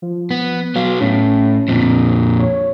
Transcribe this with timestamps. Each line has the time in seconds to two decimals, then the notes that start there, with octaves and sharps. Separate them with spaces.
0.02 F3
0.31 B3
0.76 F#3 B3 F5
1.01 A2 C#4
1.68 F2 A#2 C4
2.39 C#5